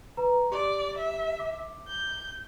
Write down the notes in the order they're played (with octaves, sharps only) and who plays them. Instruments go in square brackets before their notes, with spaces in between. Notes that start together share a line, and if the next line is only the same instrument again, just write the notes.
[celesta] B4 A#5
[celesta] G4 [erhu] D5
[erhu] E5
[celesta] D6
[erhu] G6